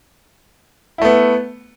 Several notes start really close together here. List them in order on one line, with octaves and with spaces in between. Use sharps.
E4 A3 B3